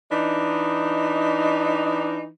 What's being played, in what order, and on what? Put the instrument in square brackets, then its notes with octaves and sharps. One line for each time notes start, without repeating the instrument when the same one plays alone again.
[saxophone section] E3 D4 D#4